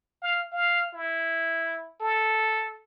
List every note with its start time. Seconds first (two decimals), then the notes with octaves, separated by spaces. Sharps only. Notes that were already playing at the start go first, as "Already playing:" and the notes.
0.22 F5
0.52 F5
0.94 E4
2.01 A4